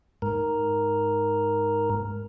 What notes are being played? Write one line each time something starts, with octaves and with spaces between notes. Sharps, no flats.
G#2 A#4